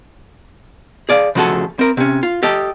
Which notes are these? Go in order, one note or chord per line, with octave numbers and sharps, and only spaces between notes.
G#4 D5 F5
C#3 F3 A3 F#4 G#4 A4
C4 A#4
C3 C#4
F4
G4 A4 D#5